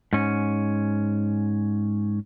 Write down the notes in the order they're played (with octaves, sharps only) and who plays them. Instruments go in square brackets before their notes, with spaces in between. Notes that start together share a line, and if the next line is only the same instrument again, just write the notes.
[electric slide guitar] G#2 C#4